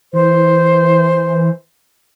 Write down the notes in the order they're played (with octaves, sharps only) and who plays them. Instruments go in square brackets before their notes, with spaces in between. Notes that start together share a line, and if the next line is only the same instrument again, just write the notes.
[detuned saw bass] E3 [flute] C5